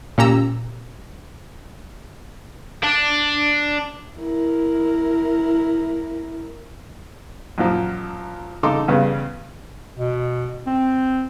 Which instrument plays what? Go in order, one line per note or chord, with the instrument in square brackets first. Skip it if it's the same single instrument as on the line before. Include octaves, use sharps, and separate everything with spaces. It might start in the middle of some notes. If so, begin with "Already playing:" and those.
[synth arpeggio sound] A#2 C#4 G4 A#5 E6
[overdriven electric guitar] D4
[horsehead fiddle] E4 A#4
[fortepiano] F#2 A#2 F3
C#3 D#4 A4 C6 D6
G2 C#3 B3
[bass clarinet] B2
C4